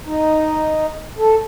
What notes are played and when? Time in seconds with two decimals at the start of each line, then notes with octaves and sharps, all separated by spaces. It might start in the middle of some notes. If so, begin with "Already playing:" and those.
0.06 D#4
1.18 A4